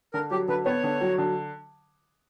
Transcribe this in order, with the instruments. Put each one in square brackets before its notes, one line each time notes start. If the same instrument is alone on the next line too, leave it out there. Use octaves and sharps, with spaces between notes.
[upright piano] D3 [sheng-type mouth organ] A#4
[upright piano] F#3 [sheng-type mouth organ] G4
[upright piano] D3 [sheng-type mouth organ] B4
[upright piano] B3 [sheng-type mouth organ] C#5
[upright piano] D3
F#3
D3